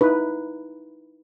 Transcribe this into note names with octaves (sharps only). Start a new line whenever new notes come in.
D#4 E4 B4